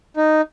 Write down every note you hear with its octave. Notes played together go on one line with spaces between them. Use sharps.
D#4